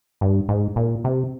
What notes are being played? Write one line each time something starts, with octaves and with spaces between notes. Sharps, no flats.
G2
G#2
A#2
C3